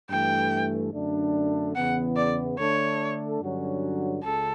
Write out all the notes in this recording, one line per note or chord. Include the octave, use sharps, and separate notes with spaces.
G2 E3 A3 G5
F#2 D3 A3 D4
E2 C#3 E3 B3 F#5
D5
D3 A3 D4 A4 C#5
G2 D3 F#3 C#4 F#4
C#2 C#3 A4